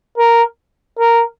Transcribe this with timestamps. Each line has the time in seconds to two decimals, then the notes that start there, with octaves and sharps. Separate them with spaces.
0.18 A#4
0.99 A#4